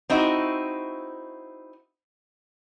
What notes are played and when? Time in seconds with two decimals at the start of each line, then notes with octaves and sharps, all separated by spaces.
0.10 C4 D#4 E4 F#4